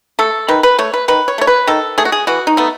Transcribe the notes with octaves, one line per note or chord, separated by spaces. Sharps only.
A3 A4
D#3 B4
B4
A3 C#5
B4
D#3 B4
C#5
A3 C#5
B4
D#3 A4
A3 G#4
F#4
G#4
E3 F#4
D#4
A3 B3